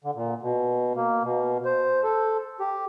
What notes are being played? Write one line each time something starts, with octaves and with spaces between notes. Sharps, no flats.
D3
A#2
B2
A#3
B2
C5
A4
G4